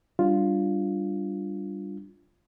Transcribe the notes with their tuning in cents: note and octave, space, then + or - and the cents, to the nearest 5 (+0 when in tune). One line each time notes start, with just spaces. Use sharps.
G3 +0 D4 +0 F4 +0